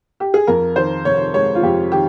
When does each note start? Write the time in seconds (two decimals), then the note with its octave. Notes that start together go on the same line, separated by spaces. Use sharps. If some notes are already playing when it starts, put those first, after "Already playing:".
0.20 G4
0.34 G#4
0.47 F2 A#4
0.76 D#3 C5
1.05 F1 C#5
1.34 G#3 C#5
1.55 F4
1.63 F2 G4
1.92 D#3 G4